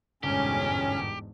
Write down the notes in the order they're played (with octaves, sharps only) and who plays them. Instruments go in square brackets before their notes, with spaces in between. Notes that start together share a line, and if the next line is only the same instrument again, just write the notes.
[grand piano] G1 [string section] E2 G#2 B2 [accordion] C#4 [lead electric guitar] G4